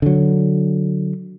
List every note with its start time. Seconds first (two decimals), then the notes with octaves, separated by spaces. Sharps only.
0.02 D3 F#3